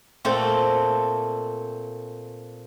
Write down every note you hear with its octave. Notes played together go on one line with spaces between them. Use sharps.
A#2 A3 C4